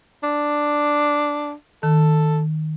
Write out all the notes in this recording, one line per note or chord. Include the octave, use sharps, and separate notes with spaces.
D4
D#3 A4